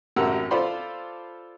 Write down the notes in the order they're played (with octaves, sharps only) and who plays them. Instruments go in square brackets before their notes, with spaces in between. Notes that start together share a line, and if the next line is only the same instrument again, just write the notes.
[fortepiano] A1 F#2 G4 A#4 F#5 E6
F4 A4 C5 D5 B5 C6